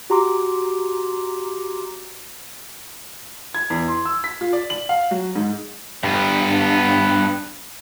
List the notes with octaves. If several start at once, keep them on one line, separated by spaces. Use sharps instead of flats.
F#4 G4 A#5 C6 D6
G#6
E2
C6
E6
B6
F4
D5
F#7
F5
F#3
G#2
G2 B3